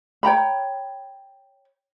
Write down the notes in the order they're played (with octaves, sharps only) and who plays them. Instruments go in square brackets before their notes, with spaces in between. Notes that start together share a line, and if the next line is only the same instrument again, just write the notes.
[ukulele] C#5 G5 A#5 B5